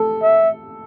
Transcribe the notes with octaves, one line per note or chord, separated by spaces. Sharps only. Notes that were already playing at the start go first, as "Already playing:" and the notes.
Already playing: A4
E5